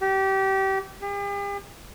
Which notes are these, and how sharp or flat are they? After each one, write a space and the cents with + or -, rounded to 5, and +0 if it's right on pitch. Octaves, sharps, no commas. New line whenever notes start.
G4 -25
G4 +45